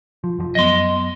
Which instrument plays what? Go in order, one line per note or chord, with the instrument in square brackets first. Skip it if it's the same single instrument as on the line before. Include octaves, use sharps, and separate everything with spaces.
[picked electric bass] F3
F1 F3
[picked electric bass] F#2 B3 [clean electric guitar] D#5 C6